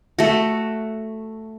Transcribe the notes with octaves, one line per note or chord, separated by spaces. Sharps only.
A3 F#4